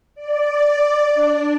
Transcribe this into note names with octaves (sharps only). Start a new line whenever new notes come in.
D5
D4